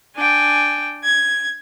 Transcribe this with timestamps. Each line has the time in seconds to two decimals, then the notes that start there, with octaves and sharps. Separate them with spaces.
0.16 D4 G5 G#5
1.05 G#6